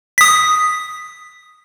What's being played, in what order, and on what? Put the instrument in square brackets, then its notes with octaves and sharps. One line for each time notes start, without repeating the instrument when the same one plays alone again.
[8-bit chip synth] D#6 B6